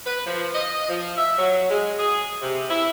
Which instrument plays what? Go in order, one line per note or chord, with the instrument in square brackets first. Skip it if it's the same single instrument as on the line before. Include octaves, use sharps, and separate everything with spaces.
[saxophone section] B4
F3
D#5
F3
E5
F#3
G#3
G#4
C3
E4